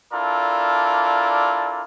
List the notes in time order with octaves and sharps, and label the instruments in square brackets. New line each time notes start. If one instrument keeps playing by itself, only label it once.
[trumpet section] D4 E4 F4 A4 A#4 D5